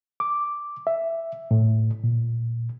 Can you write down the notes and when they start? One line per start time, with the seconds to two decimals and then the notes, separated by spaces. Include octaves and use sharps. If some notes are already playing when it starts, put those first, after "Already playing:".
0.20 D6
0.87 E5
1.51 A2
2.04 A#2